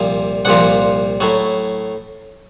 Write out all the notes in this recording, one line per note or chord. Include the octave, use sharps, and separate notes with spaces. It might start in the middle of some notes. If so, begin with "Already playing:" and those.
Already playing: C2 A#2 F3
C2 A#2 F3 F#5
A2 F#3